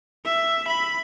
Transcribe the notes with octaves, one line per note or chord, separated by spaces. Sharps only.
E5
B5